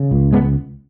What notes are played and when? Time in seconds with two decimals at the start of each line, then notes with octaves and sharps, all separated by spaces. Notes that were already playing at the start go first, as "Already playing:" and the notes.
Already playing: C#3
0.11 C#2
0.33 G#3 B3